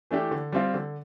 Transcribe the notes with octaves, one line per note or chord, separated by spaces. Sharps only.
E3 A3 D4 G4
D3
G3 C4 F4
D3